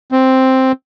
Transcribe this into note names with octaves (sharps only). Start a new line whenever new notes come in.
C4